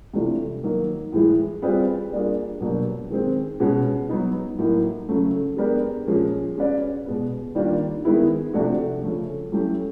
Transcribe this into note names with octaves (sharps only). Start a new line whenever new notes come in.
C3 E3 A3 D4 F4
D#3 F#3 A#3 D#4
A2 E3 G#3
G3 C4 F4 G#4 B4
G3 A#3 D4 F4 G#4
B2 F#3 A#3 D4 G4
D#3 G#3 C4
B2 G#3 C#4 F#4
F#3 B3 D#4
A2 F#3 A#3 D#4 F#4
C#3 F#3 A3 C#4
G#3 B3 D4 G4 A#4
A#2 F3 G#3 C#4
G#3 C#4 F#4 B4 D5
B2 G#3 B3
D#3 G3 A#3 D4 F4
D#3 G#3 B3 E4
C3 F3 A3 D4 F#4
C#3 F3 A3 C#4
F#3 A3 C#4 E4 G4